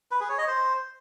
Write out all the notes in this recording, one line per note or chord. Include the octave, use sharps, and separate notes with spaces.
B4
G#4
C#5
D#5
C5